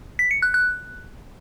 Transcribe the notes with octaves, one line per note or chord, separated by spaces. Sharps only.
B6
C#7
F#6
F#6